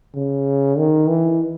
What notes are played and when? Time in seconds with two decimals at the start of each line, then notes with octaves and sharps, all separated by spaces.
0.15 C#3
0.78 D#3
1.09 E3